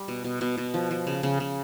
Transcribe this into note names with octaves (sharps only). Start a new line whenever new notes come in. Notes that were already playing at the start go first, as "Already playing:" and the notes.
Already playing: G3
B2
B2
B2
B2
F3
F3
C#3
C#3
C#3